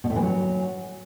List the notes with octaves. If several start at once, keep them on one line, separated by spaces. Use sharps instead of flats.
B2
A2
E3
F#3